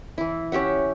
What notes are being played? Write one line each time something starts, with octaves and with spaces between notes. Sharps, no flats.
E3 E4
C#4 G4 E5 F#5